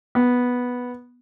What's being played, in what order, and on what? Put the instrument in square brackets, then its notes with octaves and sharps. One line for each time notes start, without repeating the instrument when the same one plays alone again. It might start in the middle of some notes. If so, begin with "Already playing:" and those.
[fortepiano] B3